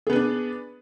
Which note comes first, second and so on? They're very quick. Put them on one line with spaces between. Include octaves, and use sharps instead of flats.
G#4 B3 B4 D4